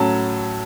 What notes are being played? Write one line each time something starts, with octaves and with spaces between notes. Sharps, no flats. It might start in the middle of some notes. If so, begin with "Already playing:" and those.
Already playing: A2 F#3 C#4 A5